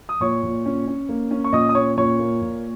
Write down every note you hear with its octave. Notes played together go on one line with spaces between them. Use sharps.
D#6
A#2 C#5 C#6
A#2
C#4
C#4
A#3
C#4
C#6
A#2 D#5 D#6
D#6
C#4 C#5 C#6
A#2 C#5 C#6
A#3
A#2